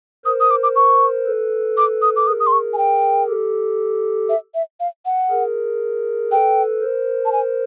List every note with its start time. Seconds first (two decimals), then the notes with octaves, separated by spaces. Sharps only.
0.25 A#4 C5 D#6
0.40 D#6
0.51 D6
0.63 D6
0.76 C#6
1.26 A4 B4
1.77 D6
2.02 D#6
2.16 D6
2.27 G#4 A#4 D#6
2.40 D#6
2.47 C6
2.52 C#6
2.73 G#5
2.78 G5
3.28 G4 A4
4.29 E5
4.55 E5
4.80 F5
5.06 F#5
5.30 G#4 A#4
6.31 A4 B4 G5
6.82 A#4 C5
7.25 A5
7.32 G#5